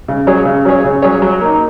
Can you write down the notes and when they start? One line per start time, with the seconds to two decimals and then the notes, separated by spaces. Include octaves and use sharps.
0.08 C#3
0.27 F#3 C#4 G#4 C#5
0.45 C#3
0.65 F#3 C#4 G#4 C#5
0.84 C#3
1.02 F#3 C#4 G#4 C#5
1.22 F#3
1.41 A#3 D#4